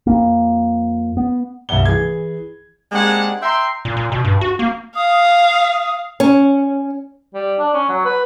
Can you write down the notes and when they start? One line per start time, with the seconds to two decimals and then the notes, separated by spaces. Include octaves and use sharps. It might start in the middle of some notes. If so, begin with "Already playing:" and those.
0.07 F2 A#3
1.17 B3
1.69 C2 G2 E5 F#5 G7
1.85 E3 G#4 G#6
2.92 G#3 A#3 C4 D4 G4 F#5
3.42 E5 G5 A#5 C6
3.85 A#2
3.97 A#2
4.12 B2
4.25 G2
4.41 F#4
4.59 A#3
4.95 F5 D#6
6.20 C#4
7.34 G3
7.59 D4
7.74 C#4
7.89 F#3
8.05 B4